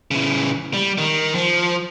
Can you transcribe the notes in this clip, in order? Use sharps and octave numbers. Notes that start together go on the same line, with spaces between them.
C#3 E3
G3
D#3
F3